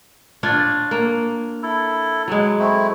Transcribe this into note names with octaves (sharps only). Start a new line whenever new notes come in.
D4 F4 C#5
A#3
E4 A4
F#3 G#3
A3 C4 E4